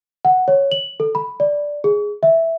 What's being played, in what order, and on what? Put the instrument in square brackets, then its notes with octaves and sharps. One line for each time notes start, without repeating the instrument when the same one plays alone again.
[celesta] F#5
C#5
F#7
A4
B5
D5
G#4
E5